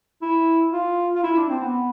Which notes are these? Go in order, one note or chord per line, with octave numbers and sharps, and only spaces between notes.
E4
F4
F4
E4
D4
C4
B3